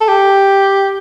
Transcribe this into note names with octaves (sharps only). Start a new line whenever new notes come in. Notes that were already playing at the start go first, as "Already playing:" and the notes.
A4
G4